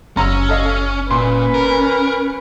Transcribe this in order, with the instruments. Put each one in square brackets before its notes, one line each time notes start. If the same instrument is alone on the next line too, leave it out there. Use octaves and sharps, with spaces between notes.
[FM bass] F#1 [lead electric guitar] C#4 [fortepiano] A#5 E6
[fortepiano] A4 D#5 F5
[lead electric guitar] A#2 [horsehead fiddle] C#4 B4 [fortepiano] C6
[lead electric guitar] A#4